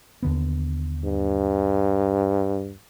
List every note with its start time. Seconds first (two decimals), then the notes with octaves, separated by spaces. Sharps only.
0.23 D#2 D3 B3
1.04 G2